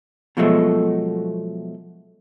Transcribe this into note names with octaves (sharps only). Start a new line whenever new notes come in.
B2 F3 F#3 G#3 A3